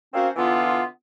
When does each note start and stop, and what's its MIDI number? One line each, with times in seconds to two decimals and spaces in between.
0.14 0.28 58
0.14 0.28 60
0.14 0.28 61
0.14 0.28 66
0.14 0.28 72
0.14 0.28 77
0.36 0.84 50
0.36 0.84 52
0.36 0.84 59
0.36 0.84 65